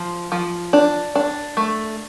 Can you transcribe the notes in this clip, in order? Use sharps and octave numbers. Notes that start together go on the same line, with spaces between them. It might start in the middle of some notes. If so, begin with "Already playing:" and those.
Already playing: F3
F3
D4
D4
A3